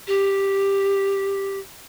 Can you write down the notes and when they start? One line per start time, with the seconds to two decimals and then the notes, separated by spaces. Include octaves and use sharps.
0.07 G4